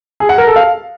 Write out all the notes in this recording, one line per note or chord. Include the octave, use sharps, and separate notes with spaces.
G#4
F#5
A#4
A4
F5